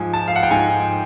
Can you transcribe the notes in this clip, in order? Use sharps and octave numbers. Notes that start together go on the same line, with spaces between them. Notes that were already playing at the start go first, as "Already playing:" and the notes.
Already playing: G#2 F3 G#5
A5
F5
F#5
G5
G#2 F3 G#5